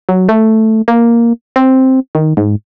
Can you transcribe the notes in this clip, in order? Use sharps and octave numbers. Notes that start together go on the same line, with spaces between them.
F#3
A3
A#3
C4
D#3
G#2